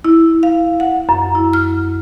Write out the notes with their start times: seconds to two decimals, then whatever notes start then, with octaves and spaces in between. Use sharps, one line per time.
0.05 E4
0.43 F5
0.80 F#5
1.09 F#2
1.35 E4
1.53 F6